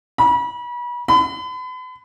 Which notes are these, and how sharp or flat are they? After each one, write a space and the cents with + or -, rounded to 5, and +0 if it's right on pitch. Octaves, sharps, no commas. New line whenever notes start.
B5 -35
B5 +40